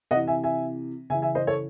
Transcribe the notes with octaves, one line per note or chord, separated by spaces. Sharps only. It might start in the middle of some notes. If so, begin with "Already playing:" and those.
C3 E3 D#5 F#5
E5 G#5
E5 G#5
C#3 E3 E5 G#5
E5 G#5
C5 D#5
A4 C#5